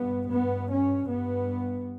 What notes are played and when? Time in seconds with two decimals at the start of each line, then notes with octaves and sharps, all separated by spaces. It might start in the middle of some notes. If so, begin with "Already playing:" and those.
Already playing: G2 B3
0.30 G2 B3
0.70 C#4
1.08 G2 B3